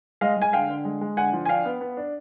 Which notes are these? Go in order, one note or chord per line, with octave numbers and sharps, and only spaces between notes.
G#3 D#5 F5
G#3 G#5
D3 F5 G5
D3
G#3
G#3
D3 F#5 G#5
F3
G#5
D4 F5 G5
B3
B3
D4